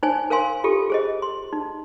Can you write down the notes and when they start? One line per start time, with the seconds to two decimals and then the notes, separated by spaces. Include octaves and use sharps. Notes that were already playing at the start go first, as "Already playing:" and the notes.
0.03 D#4 C5 C#5 G#5
0.30 A#4 C5 F5 G#5 C6
0.64 F4 G4 A4
0.90 G#4 C5 D#5
1.22 C6
1.53 D#4